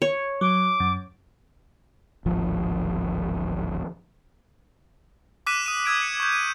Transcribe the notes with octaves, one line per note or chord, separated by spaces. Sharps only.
C#5
F#3 D6
F#2
D1 G#1 F3
D6 E6 F#6 B6 D#7 E7
D#6 D#7
D#6 E6 G#6 D7
C#7
C#6 G6
D#7